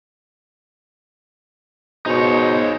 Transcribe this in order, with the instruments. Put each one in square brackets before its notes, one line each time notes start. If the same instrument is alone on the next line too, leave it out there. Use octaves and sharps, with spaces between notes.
[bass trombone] B2 [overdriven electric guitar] D#4 C#5 [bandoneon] G#4 C5